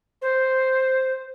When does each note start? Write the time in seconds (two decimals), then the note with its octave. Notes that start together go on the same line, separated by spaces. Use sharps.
0.22 C5